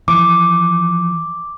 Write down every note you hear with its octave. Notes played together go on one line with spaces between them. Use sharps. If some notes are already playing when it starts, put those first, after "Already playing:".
E3 F3 D6